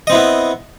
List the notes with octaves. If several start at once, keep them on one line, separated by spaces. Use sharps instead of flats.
B3 C4 E4 D#5